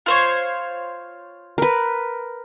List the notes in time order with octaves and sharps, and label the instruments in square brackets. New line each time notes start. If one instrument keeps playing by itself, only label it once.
[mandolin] F4 C5 C#5
[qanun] A#4 B4